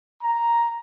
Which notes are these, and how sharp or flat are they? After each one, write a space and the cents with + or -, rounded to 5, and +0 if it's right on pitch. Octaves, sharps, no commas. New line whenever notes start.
A#5 +5